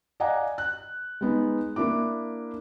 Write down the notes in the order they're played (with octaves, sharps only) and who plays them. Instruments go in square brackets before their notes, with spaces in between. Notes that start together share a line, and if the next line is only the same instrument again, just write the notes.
[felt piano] D5 D#5 F5 F#5 G#5 A#5
F#6
G#3 B3 D#4
A#3 D4 E4 D6